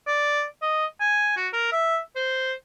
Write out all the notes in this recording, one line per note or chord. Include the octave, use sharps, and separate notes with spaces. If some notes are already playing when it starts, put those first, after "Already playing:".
D5
D#5
G#5
F#4
A#4
E5
C5